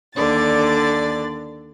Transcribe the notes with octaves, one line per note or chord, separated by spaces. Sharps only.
D#2 D3 D5 A6